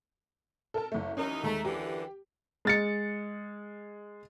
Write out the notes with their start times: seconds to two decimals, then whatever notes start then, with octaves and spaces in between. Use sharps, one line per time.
0.74 A4 A#4 A5
0.92 F#1 A3
1.17 D#2 E3 C#4 D#4 A#4
1.43 D#2 G#3 A3 A#5
1.65 F#2 D3 E3 G4
2.65 G#3 A6 C#7